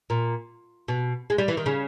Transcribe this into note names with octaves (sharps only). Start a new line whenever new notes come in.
A#2
B2
G#3
G3
E3
D#3
C#3